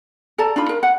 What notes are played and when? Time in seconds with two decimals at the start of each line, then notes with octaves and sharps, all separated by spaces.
0.38 A4 D5 A5 A#5
0.56 D4 D#4 F4 B5
0.69 A#4
0.83 F#5